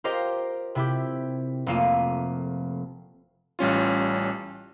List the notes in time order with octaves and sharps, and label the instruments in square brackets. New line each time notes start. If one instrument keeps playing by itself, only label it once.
[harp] F4 G4 A#4 C5 D#5
C3 E4 G4
F1 A3 A#3 F4 D#7 E7
[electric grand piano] A1 G3 C#4 F4